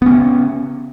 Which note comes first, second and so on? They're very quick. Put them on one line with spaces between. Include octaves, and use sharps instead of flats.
B3 C#4 C#3